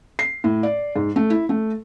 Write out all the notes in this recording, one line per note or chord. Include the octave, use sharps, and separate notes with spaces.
C7
A2
D5
G#2
A3
E4
A3